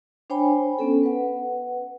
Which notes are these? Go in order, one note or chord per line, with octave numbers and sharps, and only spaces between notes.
D4 C5 C#5 G5 G#5 B5
B3 C#4 A4
B4 F#5